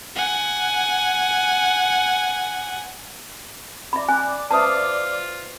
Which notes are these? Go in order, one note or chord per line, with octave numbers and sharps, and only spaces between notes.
F#5 G#5
D5 E5 B5 D6
G#5 F#6
F4 B4 C5 E5 A5 D#6